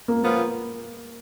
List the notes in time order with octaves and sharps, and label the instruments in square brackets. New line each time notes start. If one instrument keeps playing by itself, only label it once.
[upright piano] A#3
[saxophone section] A#2 F3 B3 F4 [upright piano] A#3